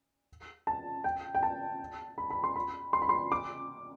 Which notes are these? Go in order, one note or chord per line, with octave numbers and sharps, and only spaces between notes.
A5
G5
G5
A5
B5
B5
C6
B5
C6
B5
C6
D6